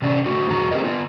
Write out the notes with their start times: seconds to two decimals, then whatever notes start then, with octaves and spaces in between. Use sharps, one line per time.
0.02 C3 C#4 D4
0.26 A2 D3 F#4
0.50 E2 F#3 F#4 G#4 A#5
0.71 C4 D#4 G4 G#4 A#4 D#5
0.84 B3 F4